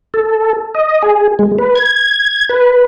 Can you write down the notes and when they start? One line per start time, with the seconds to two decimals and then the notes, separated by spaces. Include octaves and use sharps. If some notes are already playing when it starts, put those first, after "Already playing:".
0.14 A4
0.75 D#5
1.02 G#4
1.39 G#3
1.58 B4
1.75 G#6
2.49 B4